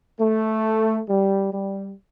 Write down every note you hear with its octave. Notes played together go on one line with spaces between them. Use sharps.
A3
G3
G3